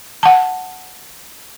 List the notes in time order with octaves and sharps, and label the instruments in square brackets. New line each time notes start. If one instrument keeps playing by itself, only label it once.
[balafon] F#5 A5